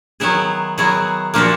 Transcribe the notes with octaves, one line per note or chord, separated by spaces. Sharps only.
D#3 F#3 B3 E4 G#4
D#3 F#3 B3 E4 G#4
A#2 F3 A#3 D4 F#4